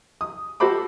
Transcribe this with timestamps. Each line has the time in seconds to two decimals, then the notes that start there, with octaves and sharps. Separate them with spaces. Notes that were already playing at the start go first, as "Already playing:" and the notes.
0.21 D#6
0.60 F#4 G4 A4 C5 B5 D6